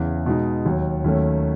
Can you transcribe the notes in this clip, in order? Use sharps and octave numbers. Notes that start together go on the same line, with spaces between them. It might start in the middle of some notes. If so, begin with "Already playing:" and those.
Already playing: E2 C#3 E3
B2 G#3 D#4
D#2 D#3 F#3
D#2 D#3 F#3 A3 C#4